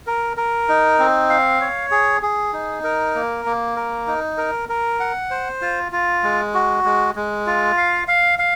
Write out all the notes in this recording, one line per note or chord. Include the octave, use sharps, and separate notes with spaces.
A#4
A#4
D#4
C4
F5
C#5
G#4
G#4
D#4
A#4
A#3
A#3
A#4
D#4
A#4
A#4
F#5
C5
F4
F4
G#3
F#4
G#3
G#3
F4
F5
F5
F5